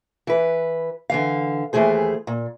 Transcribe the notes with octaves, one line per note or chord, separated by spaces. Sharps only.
E3 B4
D3 E3 F5
D#2 E3 A3 G#4 C5
A#2